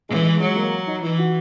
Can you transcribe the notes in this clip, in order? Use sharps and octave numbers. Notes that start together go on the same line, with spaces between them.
E3 G#3
G#3
F#3 G#3
A#3
D#4
E3 E4
F#4